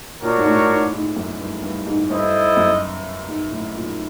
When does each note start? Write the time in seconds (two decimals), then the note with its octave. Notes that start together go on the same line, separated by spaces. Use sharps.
0.22 A#2 D4 F#4 A#4 C#5
0.38 G#2
0.46 A2
0.69 G#2
0.93 G#2
1.16 F#2
1.39 G2
1.63 G2
1.87 G#2
2.11 G2 E4 A4 C5 D#5
2.57 F#2
3.28 G#2
3.52 A2
3.75 A#2